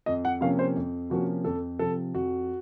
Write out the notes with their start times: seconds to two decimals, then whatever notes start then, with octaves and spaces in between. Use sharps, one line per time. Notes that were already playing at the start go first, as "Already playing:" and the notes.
0.06 F2 D#5
0.25 F#5
0.41 C3 F3 A#3 C#4 F5
0.59 C5
0.76 F2
1.10 C3 F3 A#3 C#4 F#4
1.44 F2 A4
1.79 C3 F3 A4
2.14 F2 F#4